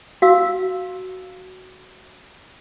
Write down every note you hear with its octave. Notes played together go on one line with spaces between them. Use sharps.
F#4 F5 E6